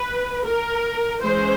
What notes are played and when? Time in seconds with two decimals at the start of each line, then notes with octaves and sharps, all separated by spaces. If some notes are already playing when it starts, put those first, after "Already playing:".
Already playing: B4
0.45 A#4
1.23 E3 G#3 C#4 C5